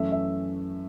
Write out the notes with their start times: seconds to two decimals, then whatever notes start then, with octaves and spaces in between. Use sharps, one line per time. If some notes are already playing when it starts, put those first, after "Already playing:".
Already playing: F#2 E3 A3 C#4 E5
0.12 E5